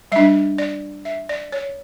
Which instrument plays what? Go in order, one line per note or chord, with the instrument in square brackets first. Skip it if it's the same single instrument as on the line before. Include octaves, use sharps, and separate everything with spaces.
[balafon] G3 D4 E5
D5
E5
D5
C#5